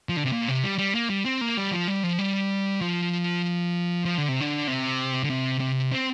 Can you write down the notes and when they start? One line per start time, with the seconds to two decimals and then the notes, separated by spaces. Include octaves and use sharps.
0.09 F3
0.17 D3
0.24 C3
0.33 A#2
0.48 C3
0.64 G3
0.78 G3
0.95 A#3
1.10 G3
1.25 C4
1.41 A#3
1.57 G3
1.72 F3
1.88 G3
2.04 F3
2.19 G3
2.81 F3
4.05 F3
4.18 D3
4.28 C3
4.40 D3
4.67 C3
5.24 D3
5.30 C3
5.60 C3
5.92 C4